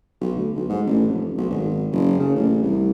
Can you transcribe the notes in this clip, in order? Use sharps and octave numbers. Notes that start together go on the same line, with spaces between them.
B1
D2
B1
G#2
A1
F1
B1
G#1
F#1
C#3
A1
C2